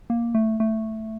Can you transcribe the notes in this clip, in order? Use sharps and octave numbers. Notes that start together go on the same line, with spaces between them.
A#3
A3
A3